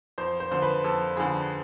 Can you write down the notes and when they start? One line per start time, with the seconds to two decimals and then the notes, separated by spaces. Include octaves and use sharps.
0.18 F2 C5
0.40 C5
0.51 D3 F3 C5
0.62 B4
0.84 F2 A4
1.17 D3 F3 G#4